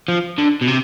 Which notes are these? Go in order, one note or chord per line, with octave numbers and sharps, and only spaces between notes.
F3
D3
B2
C3